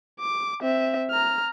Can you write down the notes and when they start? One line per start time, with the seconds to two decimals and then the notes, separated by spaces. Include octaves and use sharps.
0.20 D6
0.62 C4 E5
1.10 A#5 F6